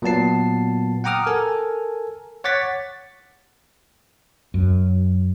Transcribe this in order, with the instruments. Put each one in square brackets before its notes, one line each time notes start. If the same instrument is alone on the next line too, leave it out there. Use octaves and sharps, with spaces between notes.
[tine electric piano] A#2 F#3 B3 A5 C7
F#5 G5 A#5 D6 D#6 F6
A4 A#4 G#5
C#5 F#5 D6 A6 B6
[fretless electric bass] F#2